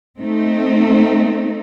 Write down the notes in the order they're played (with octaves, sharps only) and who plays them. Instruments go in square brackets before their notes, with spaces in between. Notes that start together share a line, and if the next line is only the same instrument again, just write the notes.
[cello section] A3 C4 D#4